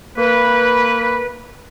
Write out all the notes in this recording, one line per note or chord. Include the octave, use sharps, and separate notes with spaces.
A#3 B4